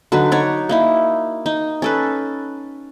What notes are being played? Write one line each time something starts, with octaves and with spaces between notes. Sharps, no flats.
D3 F#3 D#4 B4
D#4 C#5 D5
A#3 D#4 E4
D#4
C#4 A4 B4